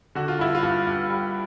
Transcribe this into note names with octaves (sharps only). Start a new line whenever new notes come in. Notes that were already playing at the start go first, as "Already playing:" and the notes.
D3 F#4
F4
G2 E4
F4
G2
G2
G3